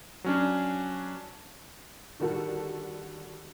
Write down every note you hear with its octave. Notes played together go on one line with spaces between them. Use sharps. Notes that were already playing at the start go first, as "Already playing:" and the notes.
F#3 C#4 D4
D3 D#3 G3 F#4 A4